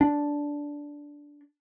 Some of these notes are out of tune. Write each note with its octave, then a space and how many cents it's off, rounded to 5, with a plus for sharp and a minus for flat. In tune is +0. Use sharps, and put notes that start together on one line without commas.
D4 -10